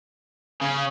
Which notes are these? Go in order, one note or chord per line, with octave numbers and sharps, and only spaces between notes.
C#3